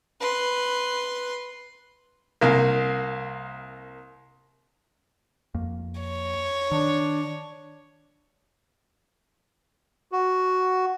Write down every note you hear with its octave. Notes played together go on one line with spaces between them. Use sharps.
B4 C6
C2 A#3
F2 A#3
C#5
D#3 D4
F#4